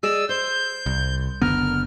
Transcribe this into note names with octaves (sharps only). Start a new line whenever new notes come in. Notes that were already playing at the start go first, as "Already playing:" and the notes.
G#4 D5 D#5 E6
C5 G6
C2
F#1 D3 B3 A#4 F6